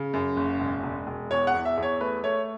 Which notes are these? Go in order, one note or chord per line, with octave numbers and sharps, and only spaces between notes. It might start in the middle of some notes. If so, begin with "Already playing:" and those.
Already playing: C#3
F#2
F#1
E1
E1
E1
E2 C#5
F#5
E2
E5
E2
C#5
A3 B4
A3 C#5